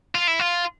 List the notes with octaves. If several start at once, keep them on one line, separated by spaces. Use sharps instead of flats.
F4
E4
F4